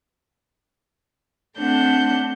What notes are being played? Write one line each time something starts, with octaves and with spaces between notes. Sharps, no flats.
A3 C4 D4 F#5 G6